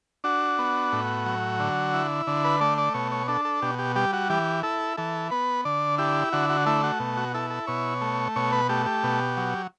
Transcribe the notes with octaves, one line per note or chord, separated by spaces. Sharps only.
D4 F#4
B3
A2
F#3
D3
E4
D3
B4
A3 D5
D5
B2 C#5
C#5
D4 A4
A4
B2 G4
G4
G3 G4
F#4
E3 G4
E4 A4
E3 A4
B3 B4
D3 D5
E4 G4
D3 F#4
F#4
A3 E4
F#4
B2
F#4
E4 A4
A4
B2 C#5
A3
B2 C#5
B4
A3 G4
G4
B2
F#3